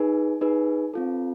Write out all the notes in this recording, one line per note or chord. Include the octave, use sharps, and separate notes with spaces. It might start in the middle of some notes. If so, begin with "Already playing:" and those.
Already playing: D#4 G#4 B4
D#4 G#4 B4
C4 F4 A4